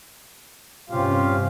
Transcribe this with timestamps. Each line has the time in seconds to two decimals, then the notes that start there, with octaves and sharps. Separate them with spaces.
0.89 G2 C3 C#4 F4 G4 F5